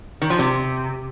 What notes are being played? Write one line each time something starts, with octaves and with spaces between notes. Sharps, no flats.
D#3
F3
C3